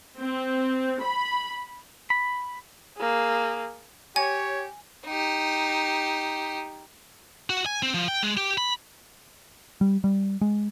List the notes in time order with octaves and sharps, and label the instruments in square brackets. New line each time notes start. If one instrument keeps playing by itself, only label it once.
[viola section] C4
B5
[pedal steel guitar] B5
[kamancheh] A#3 G#4
[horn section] G4 C#5 [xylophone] G#5
[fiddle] D#4 G4
[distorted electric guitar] F#4
G#5
C4
F3
G5
G#3
G4
B5
[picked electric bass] G3
G3
G#3